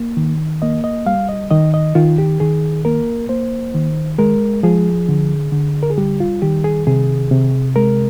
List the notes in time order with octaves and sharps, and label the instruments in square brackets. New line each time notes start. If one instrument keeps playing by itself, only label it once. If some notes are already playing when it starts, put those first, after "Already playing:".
Already playing: [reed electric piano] A#3
D#3
A#3 D#5
D#5
G3 F5
D#5
D#3 D#5
D#5
D#3 F4
G4
D#3 G#4
A#3 A#4
A#3 C5
D#3
G#3 A#4
F3 G#4
D3
D3
A#4
G#4
G3 G4
F4
D#3 G4
G#4
C3 G#4
C3
G#3 A#4